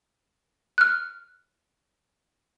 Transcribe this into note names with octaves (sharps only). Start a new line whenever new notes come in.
F6 F#6